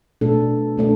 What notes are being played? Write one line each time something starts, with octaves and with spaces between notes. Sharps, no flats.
B2 A3 D4 A4
B2 A3 D4 A4